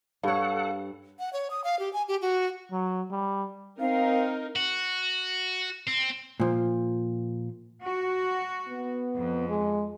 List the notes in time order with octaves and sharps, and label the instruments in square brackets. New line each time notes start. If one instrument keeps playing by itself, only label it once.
[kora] G2 C#5 [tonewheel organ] A4 F#5 [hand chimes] F5
[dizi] F#5
C#5
D#6
F5
G4
G#5
G4
F#4
[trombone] F#3
G3
[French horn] C4 [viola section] D#4 A#4 [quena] F5
[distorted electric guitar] F#4
C4
[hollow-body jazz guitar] A#2 F3
[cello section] F#4
[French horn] B3
[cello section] F2
[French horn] G#3